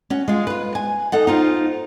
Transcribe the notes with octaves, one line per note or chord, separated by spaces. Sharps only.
C#4 F#4
G#3 F4
F4 B4
G#5
D#4 A4 F#5
D#4 F4 C5